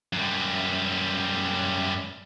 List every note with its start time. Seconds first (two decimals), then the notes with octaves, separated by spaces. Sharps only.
0.13 F#2 G3